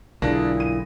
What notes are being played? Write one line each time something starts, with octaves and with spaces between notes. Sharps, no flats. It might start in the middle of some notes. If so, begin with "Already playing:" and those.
B1 A#2 D3 D4 E4 G#4 A#6
D#7